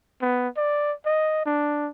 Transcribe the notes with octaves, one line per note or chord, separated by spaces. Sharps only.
B3
D5
D#5
D4